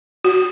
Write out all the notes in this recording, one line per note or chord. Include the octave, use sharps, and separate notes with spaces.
F#4